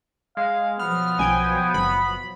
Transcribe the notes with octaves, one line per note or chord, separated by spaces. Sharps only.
G#3 F5
B2 F3 F#3 B3 F6
B1 G5 G#5
F#1 B5